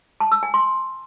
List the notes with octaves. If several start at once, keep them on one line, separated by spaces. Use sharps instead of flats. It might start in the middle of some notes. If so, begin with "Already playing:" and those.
A5
E6
G#5
C6